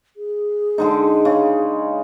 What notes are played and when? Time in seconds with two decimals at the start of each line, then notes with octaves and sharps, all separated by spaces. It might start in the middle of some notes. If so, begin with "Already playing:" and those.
0.17 G#4
0.78 D3 G#3 D#4
1.25 C#3